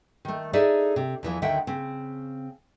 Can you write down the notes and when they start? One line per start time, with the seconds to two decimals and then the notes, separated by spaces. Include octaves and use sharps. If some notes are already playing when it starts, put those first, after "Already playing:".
0.25 D#3 A3
0.53 D#4 G#4 A4 D5 E5
0.96 C3
1.23 E2 E3 F3
1.42 D2 D3 D#3 E5 F#5 G5
1.67 C#3 C4